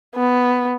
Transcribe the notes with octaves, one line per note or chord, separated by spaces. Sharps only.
B3